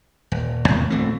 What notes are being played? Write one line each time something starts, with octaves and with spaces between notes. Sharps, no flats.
D#1
D#2 A2 C3
D#1 A#1 A3 C4